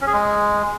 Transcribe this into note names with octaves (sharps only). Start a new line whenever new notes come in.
C#4
G#4
G#3